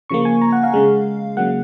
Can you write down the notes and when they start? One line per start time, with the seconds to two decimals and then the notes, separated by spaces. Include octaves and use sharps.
0.10 C#3 F3 A#3 C#6
0.25 G#5
0.41 A#5
0.52 F#5
0.63 F5
0.74 C#3 G#3
1.37 C#3 F#3 A#3 F#5